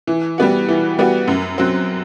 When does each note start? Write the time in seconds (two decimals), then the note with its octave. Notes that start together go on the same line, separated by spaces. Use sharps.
0.07 E3
0.38 G3 B3 F#4
0.68 E3
0.99 G3 B3 F#4
1.28 F#2
1.58 F#3 C4